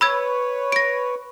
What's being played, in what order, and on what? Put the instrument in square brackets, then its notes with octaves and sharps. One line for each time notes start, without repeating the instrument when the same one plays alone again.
[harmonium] B4 C#5 [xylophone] B5 E6 G#6
[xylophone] A#6 D7